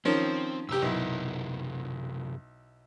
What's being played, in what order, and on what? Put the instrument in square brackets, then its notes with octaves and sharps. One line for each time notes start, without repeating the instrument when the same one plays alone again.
[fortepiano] D#3 F3 C#4 [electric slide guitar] C4
[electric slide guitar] F#2 C3 A#4 [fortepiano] G4 E6
[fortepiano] B1 E4